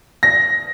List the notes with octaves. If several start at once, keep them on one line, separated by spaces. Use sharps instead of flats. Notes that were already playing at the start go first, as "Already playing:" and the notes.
A#6